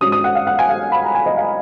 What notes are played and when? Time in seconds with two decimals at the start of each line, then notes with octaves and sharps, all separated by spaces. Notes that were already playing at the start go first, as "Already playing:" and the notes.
0.01 G#2 F#3 C#4 D#6
0.12 D#6
0.24 F#5
0.35 F5
0.47 F#5
0.59 G#5
0.69 F5
0.92 B5
1.04 A#5
1.15 G#5
1.26 D#5
1.37 F5